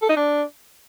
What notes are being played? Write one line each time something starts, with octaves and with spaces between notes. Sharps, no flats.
A4
D#4
D4